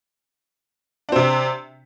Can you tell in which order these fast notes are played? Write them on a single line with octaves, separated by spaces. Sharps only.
D4 C4 C3